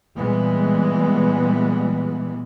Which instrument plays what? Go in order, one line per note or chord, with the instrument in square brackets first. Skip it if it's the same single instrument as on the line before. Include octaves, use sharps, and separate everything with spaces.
[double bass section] A#2 E3 G3 G#3 B3